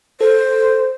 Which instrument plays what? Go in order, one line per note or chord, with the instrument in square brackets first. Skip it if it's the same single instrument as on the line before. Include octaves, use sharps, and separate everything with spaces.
[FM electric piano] A4 [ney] C5